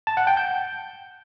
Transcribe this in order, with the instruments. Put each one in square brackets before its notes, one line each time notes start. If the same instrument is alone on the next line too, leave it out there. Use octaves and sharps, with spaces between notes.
[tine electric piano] A5
F#5
G5
G6